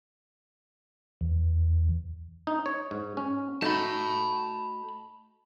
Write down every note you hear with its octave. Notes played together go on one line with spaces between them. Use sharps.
E2
D#4
C#5
G#2
C#4
A3 D#4 F#4 A5 B5